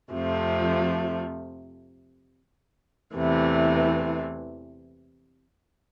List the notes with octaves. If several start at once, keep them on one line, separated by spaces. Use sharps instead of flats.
F2 C3 F3 A3
E2 C3 E3 A3